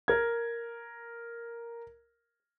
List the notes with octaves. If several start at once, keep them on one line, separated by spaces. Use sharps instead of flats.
A#4 G#6